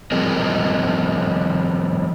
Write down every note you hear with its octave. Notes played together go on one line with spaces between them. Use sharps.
F3 G3 C4 G#4 A#4 D#5